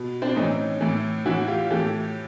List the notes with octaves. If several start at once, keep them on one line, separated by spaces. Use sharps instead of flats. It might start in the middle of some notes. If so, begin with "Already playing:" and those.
Already playing: B2
C4 D4
A2 E3 C#4 D#4
A2 E3
A2 E3 E4 F#4
F4 G4
A2 E3 G4 A4